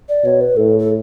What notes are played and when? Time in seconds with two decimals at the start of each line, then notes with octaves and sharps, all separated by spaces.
0.09 D5
0.25 B2 C#5
0.41 B4
0.57 A2 A4
0.79 A4